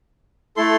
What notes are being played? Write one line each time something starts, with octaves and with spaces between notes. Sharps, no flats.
A3 E4 A4 C6